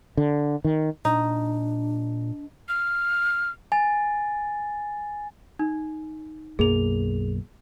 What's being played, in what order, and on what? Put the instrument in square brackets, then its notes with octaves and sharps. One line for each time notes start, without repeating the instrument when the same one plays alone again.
[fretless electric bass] D3
D#3
[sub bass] A#2 [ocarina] D4 [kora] D#4
[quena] F6
[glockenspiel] G#5 A6
[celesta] D#4
[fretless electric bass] B1 F#2 A#3 [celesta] G#4 F7